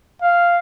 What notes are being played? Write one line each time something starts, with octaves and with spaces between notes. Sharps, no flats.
F5